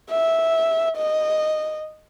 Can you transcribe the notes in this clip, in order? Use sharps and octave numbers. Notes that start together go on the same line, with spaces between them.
E5
D#5